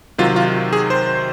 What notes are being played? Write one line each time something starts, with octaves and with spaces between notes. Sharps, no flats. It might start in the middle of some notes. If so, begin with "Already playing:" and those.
C3 D#3 F#3 F4
F4
G#4
C5